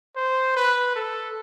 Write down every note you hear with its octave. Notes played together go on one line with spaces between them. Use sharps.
C5
B4
A4